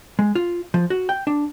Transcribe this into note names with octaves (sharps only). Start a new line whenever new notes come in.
G#3
F4
F3
F#4
G5
D4